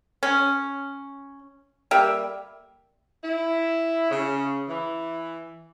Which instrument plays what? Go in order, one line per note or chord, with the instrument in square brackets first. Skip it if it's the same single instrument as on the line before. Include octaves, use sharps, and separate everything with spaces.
[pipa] C#4
G3 A#3 G4 E5
[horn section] E4
C#3
E3